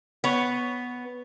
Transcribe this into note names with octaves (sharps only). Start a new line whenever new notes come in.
B3 C#5